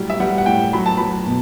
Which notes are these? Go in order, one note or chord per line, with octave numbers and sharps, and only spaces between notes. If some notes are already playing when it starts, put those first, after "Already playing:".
Already playing: A2 F#3 G3
E5
G3 F#5
F#5
A2 G5
F#3 B5
A5
F#3 B5
B2